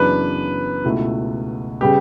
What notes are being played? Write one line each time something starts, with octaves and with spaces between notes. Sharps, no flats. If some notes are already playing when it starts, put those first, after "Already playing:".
Already playing: F#2 C#3 E3 B3 D4 B4
C#2 B2 A3 E4
C#3 G3 B3 G4